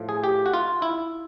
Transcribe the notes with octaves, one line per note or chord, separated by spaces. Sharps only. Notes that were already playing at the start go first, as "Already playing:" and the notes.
Already playing: A2 F3
G#4
G4
F#4
F4
E4